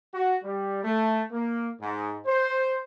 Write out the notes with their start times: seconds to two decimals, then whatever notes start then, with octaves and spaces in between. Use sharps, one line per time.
0.14 F#4
0.43 G3
0.83 A3
1.31 A#3
1.80 G#2
2.26 C5